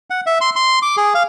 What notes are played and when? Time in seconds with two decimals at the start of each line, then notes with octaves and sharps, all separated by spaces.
0.10 F#5
0.26 E5
0.41 C6
0.56 C6
0.82 D6
0.97 G#4
1.15 F5